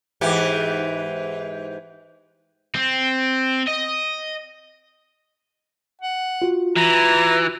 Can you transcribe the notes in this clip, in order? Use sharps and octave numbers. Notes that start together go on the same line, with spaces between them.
G#2 E3 G4
C4
D#5
F#5
F4 F#4
E3 A#5